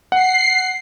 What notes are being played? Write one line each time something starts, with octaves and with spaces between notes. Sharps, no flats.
F#5 C7